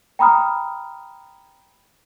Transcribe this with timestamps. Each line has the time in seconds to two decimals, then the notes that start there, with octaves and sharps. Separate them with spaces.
0.19 G5 A#5 B5 D#6 F6